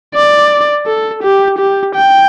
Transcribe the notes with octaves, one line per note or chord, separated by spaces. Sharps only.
D5
A4
G4
G4
G5